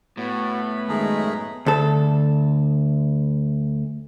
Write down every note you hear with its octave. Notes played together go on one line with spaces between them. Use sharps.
A2 B3 F#4 B5
F#2 D#3 G#3 A3 G#4 A#4
D2 A4